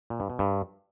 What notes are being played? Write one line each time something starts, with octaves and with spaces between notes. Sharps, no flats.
A#2
G2
B2
G2